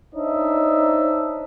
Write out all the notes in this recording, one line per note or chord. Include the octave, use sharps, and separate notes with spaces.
D4 D#4 C5 C#5 D#5 E5